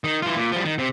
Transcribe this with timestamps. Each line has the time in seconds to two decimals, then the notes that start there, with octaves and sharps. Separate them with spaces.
0.04 D#3
0.22 E3 F4
0.36 A#2
0.52 F3 G3
0.64 D#3
0.78 C3